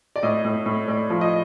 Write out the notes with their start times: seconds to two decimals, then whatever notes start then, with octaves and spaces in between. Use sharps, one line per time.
0.16 D5
0.23 A2 D#5
0.45 A2
0.66 A2
0.88 A2 D5
1.10 F3
1.21 D#5